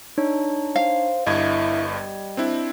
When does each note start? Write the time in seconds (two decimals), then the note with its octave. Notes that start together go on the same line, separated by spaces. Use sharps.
0.18 D4 D#4 C#5
0.76 C5 F5
1.26 G1 G2 E4 D#5 G#6
1.91 G3
2.37 C4 D4 E4